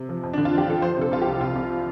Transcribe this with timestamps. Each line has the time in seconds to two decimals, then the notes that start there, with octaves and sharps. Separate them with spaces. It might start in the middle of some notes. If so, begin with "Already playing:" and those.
Already playing: C3
0.09 F3
0.23 F2
0.33 D3 D4
0.45 F4
0.53 F3
0.58 G4
0.67 D3 A4
0.81 F3 C5
0.97 C3 A4
1.12 C2 F4
1.22 G4
1.27 C2
1.41 C3 F4
1.56 C2